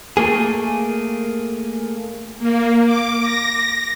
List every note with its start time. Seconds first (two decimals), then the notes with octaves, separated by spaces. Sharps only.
0.17 A3 A#3 G#4
2.39 A#3
2.85 D6
3.21 A#6